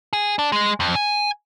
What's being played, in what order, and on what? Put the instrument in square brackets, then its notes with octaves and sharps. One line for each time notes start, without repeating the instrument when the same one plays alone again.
[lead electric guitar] G#4
D4
G#3
F2
G#5